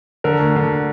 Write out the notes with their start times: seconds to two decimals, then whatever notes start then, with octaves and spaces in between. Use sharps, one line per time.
0.24 D3 A#4
0.39 D2
0.56 D3